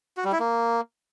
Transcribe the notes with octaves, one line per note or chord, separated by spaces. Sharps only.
F#4
G3
E4
A#3